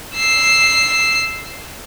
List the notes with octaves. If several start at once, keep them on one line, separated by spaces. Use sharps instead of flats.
E6 C7